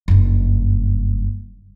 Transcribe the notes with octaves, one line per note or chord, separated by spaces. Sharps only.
F#1 G2